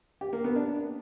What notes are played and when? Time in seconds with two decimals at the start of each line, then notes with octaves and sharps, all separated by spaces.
0.21 G4
0.33 A#3
0.44 B3
0.56 D4